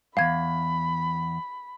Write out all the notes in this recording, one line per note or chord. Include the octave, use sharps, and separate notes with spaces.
E2 G2 F5 B5 G#6